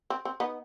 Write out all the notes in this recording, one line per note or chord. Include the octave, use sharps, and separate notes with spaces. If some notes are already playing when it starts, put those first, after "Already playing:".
C4
C4
B3 D#4